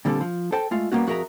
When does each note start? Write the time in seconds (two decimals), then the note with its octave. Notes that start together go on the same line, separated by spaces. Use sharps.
0.05 A#2 D3 G3 C4 A4
0.21 F3
0.52 A4 C5 G5 A5
0.71 G#3 A3 F4
0.92 G3 A#3 B3 C#4 F#4
1.07 F2 F#4 G#4 A#4 E5 A#5